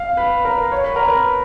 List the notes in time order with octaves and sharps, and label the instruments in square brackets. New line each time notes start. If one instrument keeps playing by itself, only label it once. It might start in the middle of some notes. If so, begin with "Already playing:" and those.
Already playing: [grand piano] F5
B4
A#4
C#5
B4
A#4
B4